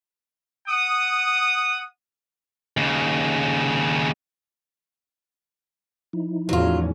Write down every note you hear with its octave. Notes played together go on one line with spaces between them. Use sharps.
F#5 D#6
D#2 C#3
F3 D#4 E4
E2 A2 F#3 C#4 F4